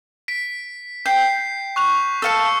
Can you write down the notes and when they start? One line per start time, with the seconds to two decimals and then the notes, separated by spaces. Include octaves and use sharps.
0.28 B6 D7
1.06 G5 G6 C7
1.76 C#6 F#6 F7
2.22 A4 F5 A5 E6 C#7